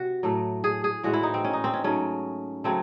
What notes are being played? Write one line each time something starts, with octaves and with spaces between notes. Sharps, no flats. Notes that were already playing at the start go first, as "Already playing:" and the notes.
Already playing: C3 F#4
A2 F#3 A3
G#4
G#4
A2 E3 G#3 F#4
E4
D#4
C4
C#4
D#4
C4
C#4
G#2 F#3 A3 C#4
C#3 F#3 A3 C4